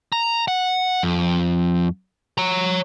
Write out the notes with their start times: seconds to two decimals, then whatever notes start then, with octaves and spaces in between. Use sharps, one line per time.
0.12 A#5
0.48 F#5
1.03 F2
2.38 C#5 A#5